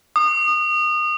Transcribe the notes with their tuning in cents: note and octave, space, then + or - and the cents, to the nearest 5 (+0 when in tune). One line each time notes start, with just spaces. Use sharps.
D#6 -30